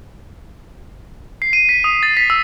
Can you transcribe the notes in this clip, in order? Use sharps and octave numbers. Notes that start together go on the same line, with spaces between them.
C7
D#7
B6
D#6
A6
B6
E6